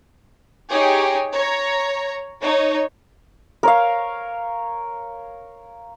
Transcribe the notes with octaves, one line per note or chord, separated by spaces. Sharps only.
D#4 G4 G#4 C#5
C#5 A#5
D#4 C#5
A#4 C#5 F5